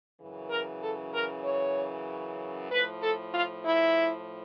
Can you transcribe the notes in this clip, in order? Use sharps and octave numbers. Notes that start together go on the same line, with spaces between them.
F#2 C#3 E3
A#4
A4
A#4
C#5
A2 F3 B4
A4
F4
E4